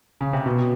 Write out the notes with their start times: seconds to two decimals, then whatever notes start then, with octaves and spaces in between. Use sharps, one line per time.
0.21 C#3
0.33 C3
0.46 B2